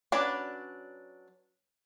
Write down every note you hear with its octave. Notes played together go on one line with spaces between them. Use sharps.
F#3 C#4 D4 B4 D5